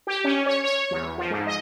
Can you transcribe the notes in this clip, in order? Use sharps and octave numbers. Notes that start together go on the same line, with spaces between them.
G4
C#4
C#5
C#5
E2
F3
G#2
D#5